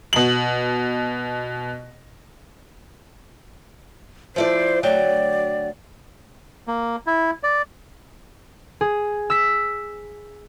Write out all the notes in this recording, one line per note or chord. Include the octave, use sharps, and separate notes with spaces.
B2 F#7
F3 E4 C5 D5
D2 F#3 D5 G5
A#3
E4
D5
G#4
E6 B6